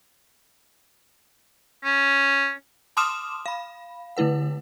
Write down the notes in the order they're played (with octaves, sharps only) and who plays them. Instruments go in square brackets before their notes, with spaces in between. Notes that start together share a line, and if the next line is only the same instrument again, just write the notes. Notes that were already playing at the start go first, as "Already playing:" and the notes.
[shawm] C#4
[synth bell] A5 C6 D6 D#6 F6 E7
F5 B5
D3 A3 E4 B4 F#5